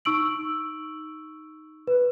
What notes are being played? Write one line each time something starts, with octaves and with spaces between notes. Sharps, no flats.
D#4 C#6 E6 D7 F#7
B4